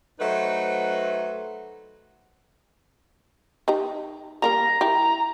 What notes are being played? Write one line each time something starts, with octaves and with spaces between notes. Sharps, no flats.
F#3 A3 D#4 B4 C5
D#4 G4 A#5
G3 A#3 A#4 A#5
E4 G4